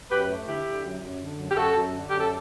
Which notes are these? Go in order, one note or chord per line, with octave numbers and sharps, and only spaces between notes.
F#2 G4 B4
A3
D3 E4 G4
D3
F#2
F#2
D3
F#2
G4
F#2 F#4 A4
F#2
D3
F#2 G4
A4